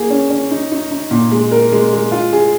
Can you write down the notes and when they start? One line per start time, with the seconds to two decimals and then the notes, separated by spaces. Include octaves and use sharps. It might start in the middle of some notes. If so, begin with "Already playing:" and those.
Already playing: A#3 G#4
0.10 C#4
0.30 C#4
0.51 D#4
0.71 D#4
0.91 D#4
1.11 A#2
1.31 G#3
1.51 A#4
1.72 G#3
1.93 G#3
2.12 F4
2.33 G#4